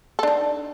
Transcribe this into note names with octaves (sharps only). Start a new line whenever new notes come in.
D4 D#4 A4